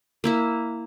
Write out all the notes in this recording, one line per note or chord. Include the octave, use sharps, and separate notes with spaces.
A#3 E4 E5